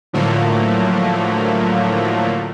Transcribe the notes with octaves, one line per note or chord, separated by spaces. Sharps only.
A2 D3 F3 F#3 A3 A#3